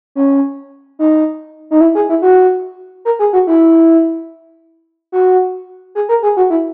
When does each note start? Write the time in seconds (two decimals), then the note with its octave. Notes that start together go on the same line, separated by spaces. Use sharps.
0.15 C#4
0.99 D#4
1.71 D#4
1.81 E4
1.95 G#4
2.09 E4
2.22 F#4
3.05 A#4
3.19 G#4
3.33 F#4
3.47 E4
5.12 F#4
5.95 G#4
6.09 A#4
6.23 G#4
6.37 F#4
6.50 E4